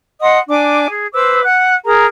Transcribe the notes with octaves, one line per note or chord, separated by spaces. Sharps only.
D#5 F#5 C6 D#6
D4 G#5 D6
G#4
B4 C5 D6 E6
F#5 F#6
G#4 A#4 A#5